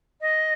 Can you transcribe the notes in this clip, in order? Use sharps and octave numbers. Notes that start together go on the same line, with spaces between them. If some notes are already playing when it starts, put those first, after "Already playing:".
D#5